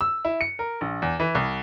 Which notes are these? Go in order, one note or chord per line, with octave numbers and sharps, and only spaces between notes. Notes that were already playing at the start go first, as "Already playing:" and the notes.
E6
E4
C#7
A#4
A#1
E2
E3
C2